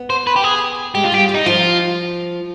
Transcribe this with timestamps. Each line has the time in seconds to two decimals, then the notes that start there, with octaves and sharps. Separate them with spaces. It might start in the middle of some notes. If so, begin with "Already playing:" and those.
Already playing: B3
0.10 C5
0.27 B4
0.36 G4
0.44 G#4
0.95 G#3 G4
1.04 F4
1.12 G3 G4
1.29 G3
1.35 D#4
1.46 F3 F4